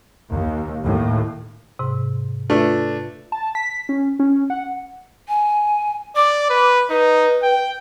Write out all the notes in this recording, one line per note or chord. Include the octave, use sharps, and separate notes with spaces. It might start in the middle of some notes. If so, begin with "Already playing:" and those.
D#2
D#2 A2
G#2 C3
A3 D4 F4 B4
A5
B6
C#4
C#4
F#5
G#5
D5 D6
B4
D#4 B4
G5